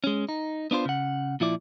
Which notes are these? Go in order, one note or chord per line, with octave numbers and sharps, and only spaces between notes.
G#3 C#4
D#4
B3 D4 F4 C5
C#3 F#5
A#2 F3 E4 D5